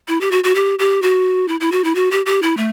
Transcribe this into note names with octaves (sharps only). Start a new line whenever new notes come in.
E4
G4
F#4
F#4
G4
G4
F#4
E4
E4
F#4
E4
F#4
G4
G4
E4
A3